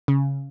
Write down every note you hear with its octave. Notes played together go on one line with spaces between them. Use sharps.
C#3